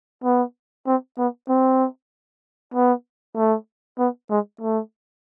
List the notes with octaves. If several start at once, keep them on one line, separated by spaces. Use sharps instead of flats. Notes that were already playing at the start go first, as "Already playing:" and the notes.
B3
C4
B3
C4
B3
A3
B3
G#3
A3